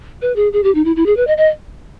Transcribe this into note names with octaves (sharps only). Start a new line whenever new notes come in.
B4
G#4
G#4
G4
D#4
E4
E4
G#4
B4
D#5
D#5